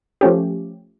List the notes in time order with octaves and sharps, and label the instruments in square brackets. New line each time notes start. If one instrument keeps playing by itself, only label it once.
[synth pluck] F3 A3 C#4 G4